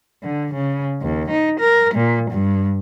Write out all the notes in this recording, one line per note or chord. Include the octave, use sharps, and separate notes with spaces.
D3
C#3
D#2
D#4
A#4
A#2
G2